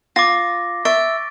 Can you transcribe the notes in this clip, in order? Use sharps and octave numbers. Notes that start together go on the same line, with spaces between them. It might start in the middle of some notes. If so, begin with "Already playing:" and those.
F4 D6 A#6
E5 C#6 A6 D7